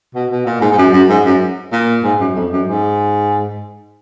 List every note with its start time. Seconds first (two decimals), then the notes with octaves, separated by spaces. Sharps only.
0.15 B2
0.31 B2
0.46 A#2
0.61 G#2
0.72 G#2
0.78 F#2
0.93 F#2
1.09 G#2
1.25 F#2
1.73 A#2
2.04 G#2
2.20 F#2
2.35 F2
2.51 F#2
2.68 G#2